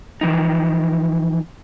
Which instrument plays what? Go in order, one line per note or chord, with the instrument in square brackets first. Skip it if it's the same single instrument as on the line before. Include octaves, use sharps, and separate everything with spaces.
[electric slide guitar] E3 F3 D#4